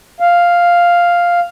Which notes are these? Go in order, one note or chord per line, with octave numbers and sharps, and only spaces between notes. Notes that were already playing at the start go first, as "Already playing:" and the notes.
F5